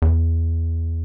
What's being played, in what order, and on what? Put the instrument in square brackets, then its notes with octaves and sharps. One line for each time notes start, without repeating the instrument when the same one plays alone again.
[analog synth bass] E2